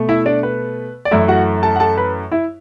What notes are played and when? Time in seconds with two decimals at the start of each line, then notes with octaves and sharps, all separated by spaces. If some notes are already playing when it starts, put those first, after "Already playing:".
Already playing: B2 A3
0.09 E4 E5
0.26 D4 D5
0.43 B4
1.05 D5
1.11 F#2 E3 A3 E4 E5
1.28 F#4 F#5
1.63 A4 A5
1.76 F#5
1.80 A4 A5
1.97 B4 B5
2.32 E4 E5